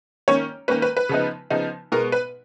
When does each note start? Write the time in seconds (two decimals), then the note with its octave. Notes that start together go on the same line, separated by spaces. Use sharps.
0.28 D#3 A#3 C#4 C#5
0.68 D#3 A#3 C#4 B4
0.82 B4
0.97 B4
1.09 C#3 F3 B3 D#4
1.50 C#3 F3 B3 D#4
1.92 B2 G#3 B3 A#4
2.12 B4